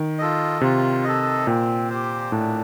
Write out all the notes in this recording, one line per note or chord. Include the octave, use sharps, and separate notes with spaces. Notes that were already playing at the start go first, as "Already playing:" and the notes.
Already playing: D#3
F4 A4 D#5
C3 F4
A4 D#5
A#2 C4
G4 C5
A2 D4